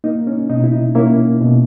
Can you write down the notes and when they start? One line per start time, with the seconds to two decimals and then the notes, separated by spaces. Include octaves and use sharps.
0.04 A#3 D#4
0.27 C#4
0.49 B2 D#4
0.64 E4
0.72 D#4
0.95 A#3 C#4 E4
1.41 B2